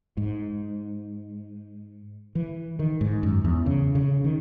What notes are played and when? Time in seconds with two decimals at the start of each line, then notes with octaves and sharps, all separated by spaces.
0.17 G#2
2.35 E3
2.79 D#3
3.01 G#2
3.23 F#2
3.45 E2
3.66 C#3
3.95 C#3
4.24 D#3